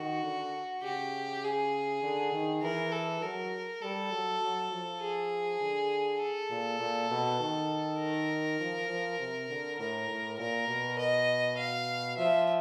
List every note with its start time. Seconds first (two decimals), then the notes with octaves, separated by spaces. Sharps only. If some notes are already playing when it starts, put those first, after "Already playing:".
Already playing: D#3 F#4
0.23 D3
0.83 C#3 G4
1.43 G#4
2.03 D3
2.33 D#3
2.62 E3 A#4
2.92 A4
3.22 F#3 A#4
3.82 G3 A4
4.12 F#3
4.41 F#3
4.71 F3
5.01 G#4
5.61 D3
6.21 A4
6.50 A#2
6.80 A#2
7.10 B2
7.40 D#3
7.99 A#4
8.60 F3
8.89 F3
9.19 C3
9.49 D3
9.79 A2 A#4
10.09 A2
10.39 A#2 A#4
10.68 B2
10.98 D#5
11.58 F5
12.17 F3 E5